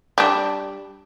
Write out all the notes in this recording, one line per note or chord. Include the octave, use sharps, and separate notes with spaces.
G3 D4